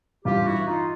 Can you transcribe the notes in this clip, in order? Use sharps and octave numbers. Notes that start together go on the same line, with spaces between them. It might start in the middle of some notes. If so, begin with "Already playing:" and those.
A1 G2 E3 F4 G4
E4 F#4
D#4 F4